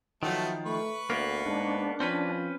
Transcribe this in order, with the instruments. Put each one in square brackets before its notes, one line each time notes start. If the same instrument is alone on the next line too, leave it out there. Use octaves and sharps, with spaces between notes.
[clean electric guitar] D#3 F3 [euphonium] F#3 [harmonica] A3 B3
[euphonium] A3 [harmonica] B4 C#6
[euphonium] D2 [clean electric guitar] A#3 B3
[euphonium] G#2 [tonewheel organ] D4
[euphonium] F3 [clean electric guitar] C4 C#4 B4